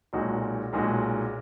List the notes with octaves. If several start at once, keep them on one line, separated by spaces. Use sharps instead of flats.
B1 A#2 G#3 D#4 F#4
B1 A#2 G#3 D#4 F#4